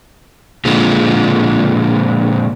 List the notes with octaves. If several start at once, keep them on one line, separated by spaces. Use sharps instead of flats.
A#2 D3 F3 G#3